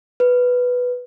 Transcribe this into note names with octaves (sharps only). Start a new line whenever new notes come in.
B4